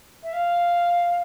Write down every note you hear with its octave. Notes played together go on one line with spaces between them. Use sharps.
E5
F5